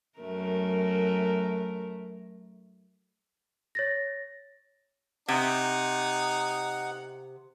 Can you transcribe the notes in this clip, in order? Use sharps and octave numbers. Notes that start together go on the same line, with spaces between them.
F#2 A3 A#4
C#5 A6 A#6
C3 D#4 F#5